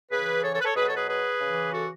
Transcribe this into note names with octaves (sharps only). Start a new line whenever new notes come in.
C#3 E3 G#4 B4
A4 C#5
A4 C#5
B4
A4 C#5
B2 F#3 G#4 B4
A4 C#5
G#4 B4
G#4 B4
C#3 E3
F#4 A4